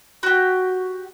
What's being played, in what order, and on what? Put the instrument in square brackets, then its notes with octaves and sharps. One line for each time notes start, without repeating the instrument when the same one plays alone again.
[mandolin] F#4 G4